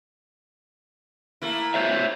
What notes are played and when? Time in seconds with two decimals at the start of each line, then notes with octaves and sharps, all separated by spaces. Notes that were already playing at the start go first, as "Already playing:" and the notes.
1.42 A3 A#3 E4
1.74 C5 C#5 E5